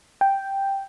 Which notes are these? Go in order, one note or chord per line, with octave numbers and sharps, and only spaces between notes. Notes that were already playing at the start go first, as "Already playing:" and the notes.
G5